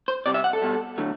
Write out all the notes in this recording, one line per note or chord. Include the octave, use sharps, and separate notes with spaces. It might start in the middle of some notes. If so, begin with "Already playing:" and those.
C5
C3 G3 D5
E5
F#5
A4
B2 G3
D3 F#3 A3